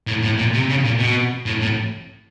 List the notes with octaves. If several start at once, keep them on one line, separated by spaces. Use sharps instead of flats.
A2
A2
A#2
C3
C#3
A#2
B2
A2
A2